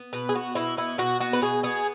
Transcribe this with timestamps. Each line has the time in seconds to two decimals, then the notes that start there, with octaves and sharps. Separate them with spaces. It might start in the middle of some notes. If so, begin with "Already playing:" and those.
Already playing: B3
0.13 B2 B4
0.29 G#4
0.35 B3 F#4
0.55 B2 E4
0.77 B3 E4
0.98 B2 F#4
1.20 B3 F#4
1.33 B4
1.42 B2 G#4
1.63 B3 G#4